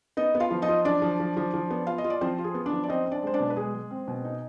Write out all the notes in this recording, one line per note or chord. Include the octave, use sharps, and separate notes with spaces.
B3 D#4 D#5
B3
F4 F5
F3
D#4 D#5
F4
F3 D4 D5
F3
F3
F3
F3
B3
F4 F5
D#5
F4
D5
F3 C4 C5
F4
G#4
B3
D4 D5
F3
D5
C4 D#4 D#5
C4
D4 D5
G#3 C5
D4 D5
B2
B4
G#3 G#4
G#3
C4
B2
D#4